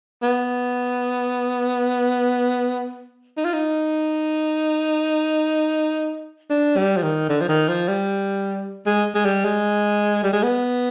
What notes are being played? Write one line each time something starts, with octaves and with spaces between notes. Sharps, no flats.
B3
D#4
F4
D#4
D4
G3
F3
D#3
D3
F3
D#3
F3
G3
G#3
G#3
G3
G#3
G3
G#3
B3